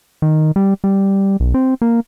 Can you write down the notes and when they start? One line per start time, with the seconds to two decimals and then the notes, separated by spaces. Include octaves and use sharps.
0.22 D#3
0.56 G3
0.84 G3
1.40 B1
1.54 C4
1.82 A#3